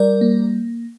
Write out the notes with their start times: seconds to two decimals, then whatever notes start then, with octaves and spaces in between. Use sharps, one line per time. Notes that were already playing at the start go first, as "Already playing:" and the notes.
Already playing: G3 A#4 D5
0.21 A#3